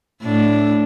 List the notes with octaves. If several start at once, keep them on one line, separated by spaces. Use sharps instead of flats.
A2 D4